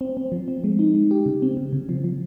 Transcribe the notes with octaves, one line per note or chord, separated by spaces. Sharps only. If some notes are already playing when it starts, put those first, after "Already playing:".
C4
C4
F3
C4
G#3
D#4
G#3
G4
C#3
C4
C#3
C#3
F3
F3